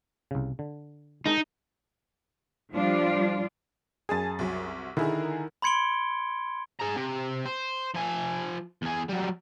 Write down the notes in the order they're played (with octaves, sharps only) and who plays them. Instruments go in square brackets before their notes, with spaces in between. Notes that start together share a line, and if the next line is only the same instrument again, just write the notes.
[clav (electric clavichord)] C2 C#3
D3
[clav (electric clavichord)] G#3 A#4 A5 [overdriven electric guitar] D#4
[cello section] F3 G3 D4 F4 D5
[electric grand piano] F#2 G#4 [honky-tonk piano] G#5 A5 A6
[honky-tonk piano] C2 F#3
[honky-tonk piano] D3 G#4 A#4 [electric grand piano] D#3 E4
[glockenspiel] B5 C6 G#6 C#7 D7 G7
[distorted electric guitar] G#4 A#5
C3
C5
F3 G#5
E2 G#4
F#3 G3